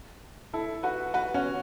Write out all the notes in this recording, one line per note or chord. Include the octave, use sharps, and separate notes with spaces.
E4 A4
F#4 B4
F#4 B4
C#4 F#4